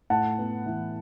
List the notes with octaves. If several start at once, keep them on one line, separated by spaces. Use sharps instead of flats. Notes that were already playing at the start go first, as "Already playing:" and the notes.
A2 F#5 A5
B3
E3